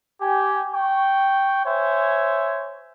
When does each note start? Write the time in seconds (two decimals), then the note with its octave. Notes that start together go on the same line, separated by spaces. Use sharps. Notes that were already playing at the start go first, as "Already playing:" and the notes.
0.20 G4 G#5
0.73 G5 C#6
1.64 C5 C#5 E5 G#5